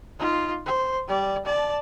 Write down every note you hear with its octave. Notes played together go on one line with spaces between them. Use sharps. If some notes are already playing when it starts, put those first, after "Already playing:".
D#4 F4
C5
G3 D5
D5 A5